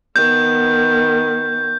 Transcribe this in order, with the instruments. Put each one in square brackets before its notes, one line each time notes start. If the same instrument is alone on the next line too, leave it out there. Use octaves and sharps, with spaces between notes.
[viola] D#3 B3 [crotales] G6